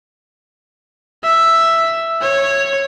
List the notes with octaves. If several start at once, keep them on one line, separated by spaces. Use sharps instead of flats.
E5
C#5